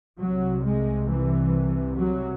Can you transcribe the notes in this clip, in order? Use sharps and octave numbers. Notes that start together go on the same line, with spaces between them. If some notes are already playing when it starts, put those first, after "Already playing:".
C2 C3 F#3
G#3
E3
F#3